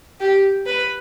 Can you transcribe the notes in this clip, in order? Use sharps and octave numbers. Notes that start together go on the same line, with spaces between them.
G4
B4